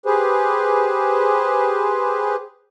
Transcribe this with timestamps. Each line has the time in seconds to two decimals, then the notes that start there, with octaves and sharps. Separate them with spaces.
0.06 G4 G#4 B4 C5